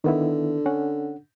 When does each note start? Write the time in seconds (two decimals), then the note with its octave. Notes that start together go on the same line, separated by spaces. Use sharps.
0.04 D3 D#3 B3 E4
0.66 C#4 F#5